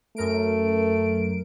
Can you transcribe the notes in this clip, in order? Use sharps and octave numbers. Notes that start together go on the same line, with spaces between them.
F#2 A3 A#4 D7